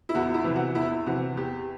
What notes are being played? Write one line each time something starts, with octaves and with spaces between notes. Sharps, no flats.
E4
E2 F#4
E4
C3 E3
F#4
E2 E4
C3 E3 F#4
E2 G4